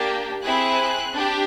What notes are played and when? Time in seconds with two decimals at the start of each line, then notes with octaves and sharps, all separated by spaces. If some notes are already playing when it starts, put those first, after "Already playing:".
Already playing: A#3 D4 G4
0.43 C4 E4 G#4 F#6
1.13 D4 G4